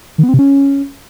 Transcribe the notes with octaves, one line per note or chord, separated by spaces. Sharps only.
D#3
B3
C4
C3
C#4